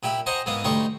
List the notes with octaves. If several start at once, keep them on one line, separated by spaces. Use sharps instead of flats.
A#2 E4 G4 B5
C5 D#5 F#5 G#5 A#5
G#2 E3 A#3 B3 D#6
D2 G3 D#4 C6 C#6